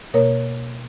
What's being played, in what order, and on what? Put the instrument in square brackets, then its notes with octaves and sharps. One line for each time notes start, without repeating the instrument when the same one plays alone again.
[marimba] B2 A#3 A#4 C#5